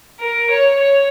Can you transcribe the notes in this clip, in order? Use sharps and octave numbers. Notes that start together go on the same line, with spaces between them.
A#4
C#5
C#5